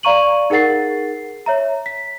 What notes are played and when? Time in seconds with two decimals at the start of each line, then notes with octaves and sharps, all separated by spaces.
0.03 D5 F5 A#5 C#6 D#7 F#7
0.50 D#4 G#4 A#4 F#5 A6 C7
1.46 C#5 E5 A#5
1.86 B6